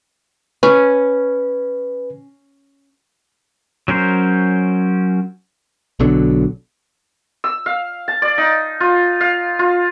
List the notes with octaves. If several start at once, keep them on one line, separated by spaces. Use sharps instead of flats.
C#4 B4
F#3 C#4 A#4 C5
B1 B2 D3 F#3
E6
F5
A5
D5
D#4
F4
F5
F4